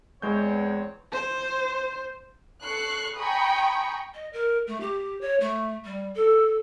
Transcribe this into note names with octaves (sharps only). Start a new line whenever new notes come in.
E2 G#3 C4 C#5 G6
C5
A4 C#6 F#6 C7
G5 G#5 A#5 B5 C#6 D#6
D#5
A#4
A3
G4
C#5
A3
G3
A4